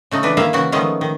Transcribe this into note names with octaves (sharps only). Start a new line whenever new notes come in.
C#3 A3 D#4
E3 D4 B4
D#3 A#3 E4 E5 F5
C#3 E3 F#4
D#3 F3 G#3 A3 B3 C#4
D#3